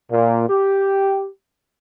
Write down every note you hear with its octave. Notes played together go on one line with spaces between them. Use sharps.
A#2
G4